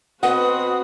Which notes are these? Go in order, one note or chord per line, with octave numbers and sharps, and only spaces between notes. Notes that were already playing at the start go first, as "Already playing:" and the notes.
B2 C4 F#4 B4 F#5 D#6